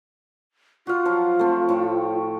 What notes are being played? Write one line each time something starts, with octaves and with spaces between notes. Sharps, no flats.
F4 F#4 F5
F3 F#3
A3 C4
A2 C#5 G5